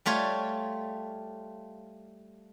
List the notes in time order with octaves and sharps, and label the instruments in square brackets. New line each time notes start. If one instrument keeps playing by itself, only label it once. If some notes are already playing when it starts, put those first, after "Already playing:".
[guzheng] G3 A3 F4 C#5